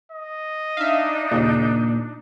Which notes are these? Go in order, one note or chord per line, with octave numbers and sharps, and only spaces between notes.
D#5
D4 D#4 E5 F5
D#2 A#2 C#3